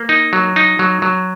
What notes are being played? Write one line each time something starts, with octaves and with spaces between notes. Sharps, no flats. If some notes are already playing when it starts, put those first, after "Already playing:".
Already playing: A#3
D#4
F#3
D#4
F#3
F#3